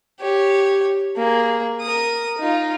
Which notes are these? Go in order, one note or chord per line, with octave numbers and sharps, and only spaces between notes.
G4 C#5
A#3 G#4
A#4 D#6
D#4 F4